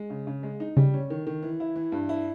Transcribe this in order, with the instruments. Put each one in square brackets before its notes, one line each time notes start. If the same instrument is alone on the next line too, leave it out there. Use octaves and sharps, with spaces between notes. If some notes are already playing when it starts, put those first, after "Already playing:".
Already playing: [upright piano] G#3
C#3
C#3
G#3
D#4
[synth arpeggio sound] C#3 [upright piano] G3
[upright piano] C#4
D#3
D#3
E3
E4
E3
G2
E4